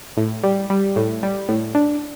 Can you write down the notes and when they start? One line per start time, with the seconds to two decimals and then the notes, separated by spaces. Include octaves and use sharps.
0.17 A2
0.43 G3
0.70 G3
0.96 A2
1.23 G3
1.49 A2
1.75 D4